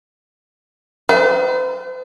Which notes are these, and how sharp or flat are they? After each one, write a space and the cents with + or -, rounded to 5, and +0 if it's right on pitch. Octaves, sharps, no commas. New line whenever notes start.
C5 -45